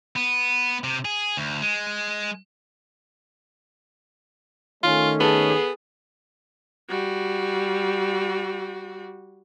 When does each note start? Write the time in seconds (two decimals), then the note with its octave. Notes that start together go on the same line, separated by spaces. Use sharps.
0.16 B3
0.84 C3
1.05 G#4
1.37 D2
1.62 G#3
4.83 D#3 A3 C#4 F4
5.20 B3 G#4 A4
6.89 G3 F#4